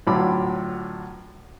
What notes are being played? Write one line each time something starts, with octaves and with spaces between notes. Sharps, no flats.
D2 A2 F#3 F4 B5 D6